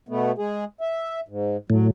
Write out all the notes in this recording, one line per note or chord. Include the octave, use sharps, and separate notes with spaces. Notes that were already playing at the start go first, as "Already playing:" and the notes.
B2 A3 B3
G#3 G#4
E5
G#2
A2 F#3